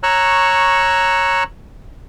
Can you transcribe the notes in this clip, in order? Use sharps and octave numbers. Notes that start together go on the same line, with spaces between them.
C#5 A#5 C#6 E6 F#6